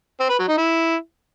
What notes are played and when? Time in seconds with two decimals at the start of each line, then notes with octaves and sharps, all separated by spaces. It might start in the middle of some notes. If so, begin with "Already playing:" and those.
0.20 C4
0.30 B4
0.39 F#3
0.48 D#4
0.58 E4